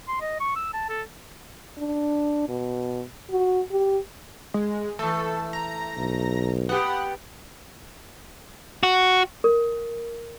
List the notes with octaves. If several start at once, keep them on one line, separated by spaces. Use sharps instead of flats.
C6
D#5
C#6
E6
A5
A4
D4
B2
F#4
G4
G#3
E3 A3 A4
A#5
B1
B3 G4 F#5
F#4
A#4